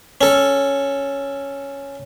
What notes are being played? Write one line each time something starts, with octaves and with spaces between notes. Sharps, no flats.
C#4 A4